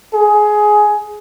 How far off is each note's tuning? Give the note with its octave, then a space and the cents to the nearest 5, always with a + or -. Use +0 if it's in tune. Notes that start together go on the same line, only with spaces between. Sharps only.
G#4 +15